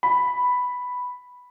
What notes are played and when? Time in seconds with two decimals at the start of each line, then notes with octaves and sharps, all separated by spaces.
0.03 B5